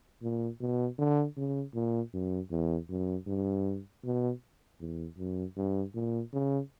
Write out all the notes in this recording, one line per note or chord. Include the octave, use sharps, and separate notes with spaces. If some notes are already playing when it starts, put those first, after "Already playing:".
A#2
B2
D3
C#3
A#2
F#2
E2
F#2
G2
B2
E2
F#2
G2
A#2
C#3